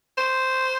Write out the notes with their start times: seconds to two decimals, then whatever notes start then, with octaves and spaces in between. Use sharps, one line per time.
0.18 C5